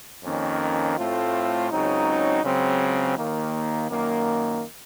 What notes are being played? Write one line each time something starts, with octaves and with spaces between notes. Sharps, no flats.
F2 D#3 A#3 C#4
A2 A3 C4 F4
C#2 C#3 F#3 C4 D#4
C#2 C#3 F#3 C4
D#2 D#3 A#3
F#2 D#3 A#3